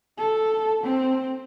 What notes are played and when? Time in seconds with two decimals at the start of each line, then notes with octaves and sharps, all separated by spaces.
0.18 A4
0.84 C4